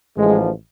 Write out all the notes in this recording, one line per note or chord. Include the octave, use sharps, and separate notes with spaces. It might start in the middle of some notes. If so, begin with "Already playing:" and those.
A1 G#2 F3 G#3